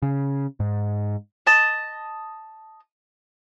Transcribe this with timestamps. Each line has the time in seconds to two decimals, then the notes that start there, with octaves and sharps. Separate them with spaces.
0.02 C#3
0.60 G#2
1.46 D#5 A5